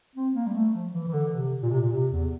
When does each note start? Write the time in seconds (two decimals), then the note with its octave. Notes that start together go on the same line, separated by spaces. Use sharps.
0.16 C4
0.35 A#3
0.46 G3
0.55 A3
0.74 F3
0.94 E3
1.08 E3
1.13 D3
1.33 C3
1.62 A#2
1.72 C3
1.81 A#2
1.92 C3
2.11 E2